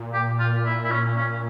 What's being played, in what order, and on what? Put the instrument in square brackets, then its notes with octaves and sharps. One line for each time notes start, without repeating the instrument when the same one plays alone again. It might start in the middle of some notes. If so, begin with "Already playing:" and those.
Already playing: [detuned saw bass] A#2
[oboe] G4
F4
E4
E4
C#4
C#4